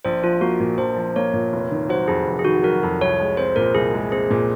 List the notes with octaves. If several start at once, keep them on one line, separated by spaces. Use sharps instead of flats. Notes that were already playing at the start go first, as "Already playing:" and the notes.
A#1 C5
F3 F4
A#3 F#4
A#2
A#1 C5
F3
A#3 C#5
A#2
F1
D#3
F#3 C5
F2 G#4
F1
G#4
D#3 F#4
F#3 A#4
F2
C2 C#5
G#3
C4 C5
A#2 A#4
C2 G#4
G#3
C4 G#4
A#2